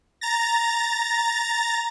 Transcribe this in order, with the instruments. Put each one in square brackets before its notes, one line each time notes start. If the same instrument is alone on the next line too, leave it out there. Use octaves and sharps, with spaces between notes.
[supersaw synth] A#5 A6 A#6